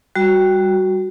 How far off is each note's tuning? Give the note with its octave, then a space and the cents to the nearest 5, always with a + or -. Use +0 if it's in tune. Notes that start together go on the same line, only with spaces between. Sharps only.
G3 +0 F#4 +0